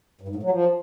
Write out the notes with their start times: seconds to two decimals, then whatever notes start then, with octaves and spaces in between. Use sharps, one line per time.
0.21 G2
0.28 G#2
0.36 A2
0.43 F#3
0.50 F3